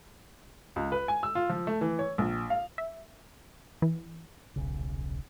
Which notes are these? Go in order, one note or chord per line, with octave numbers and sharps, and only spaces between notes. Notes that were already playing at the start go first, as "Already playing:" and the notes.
C#2
B4
G#5
E6
F4
F3
A3
E3
C#5
A#1
F5
E5
E3
D#1 B1 C#3